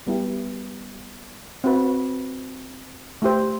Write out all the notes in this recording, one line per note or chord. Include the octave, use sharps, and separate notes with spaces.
G3 B3 E4 G4
C4 F#4 B4
A3 E4 G4 C5